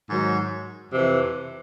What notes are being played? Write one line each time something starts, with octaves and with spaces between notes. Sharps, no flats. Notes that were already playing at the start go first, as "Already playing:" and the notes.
G#2 D#3 F#3
F2 C3 E3